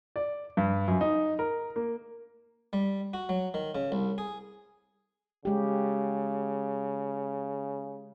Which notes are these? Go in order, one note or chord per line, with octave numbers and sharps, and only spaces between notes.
D5
G2
F#2
D#4
A#4
A#3
G3
F#4
F#3
D#3
C#3
C2
G#4
C#3 G#3 G4